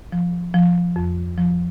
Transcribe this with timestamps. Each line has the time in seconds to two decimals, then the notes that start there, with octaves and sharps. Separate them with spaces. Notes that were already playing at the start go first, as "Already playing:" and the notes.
0.12 F3
0.54 F3
0.96 F2
1.38 F3